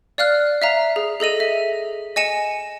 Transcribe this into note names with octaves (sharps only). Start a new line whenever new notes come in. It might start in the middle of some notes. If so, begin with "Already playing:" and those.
D5 F5 F6 F#6
E5 F5 A#5
G#4
G#4 A4 D#5 D#7
E5
D#5 G#5 C#7 E7